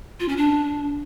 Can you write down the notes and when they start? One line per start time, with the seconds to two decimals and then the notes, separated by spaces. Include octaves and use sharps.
0.20 F4
0.29 C#4
0.37 D4